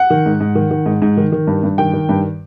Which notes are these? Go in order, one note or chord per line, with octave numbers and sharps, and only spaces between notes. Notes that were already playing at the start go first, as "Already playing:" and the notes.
Already playing: F#5
D#3
G#2
G#2
D#3
D#3
G#2
G#2
D#3
D#3
G2
G2
D#3 G5
D#3
G2